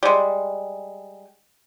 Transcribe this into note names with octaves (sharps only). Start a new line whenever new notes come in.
G3 G#3